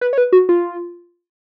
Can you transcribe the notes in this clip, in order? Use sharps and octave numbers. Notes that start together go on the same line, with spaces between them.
B4
C#5
B4
F#4
F4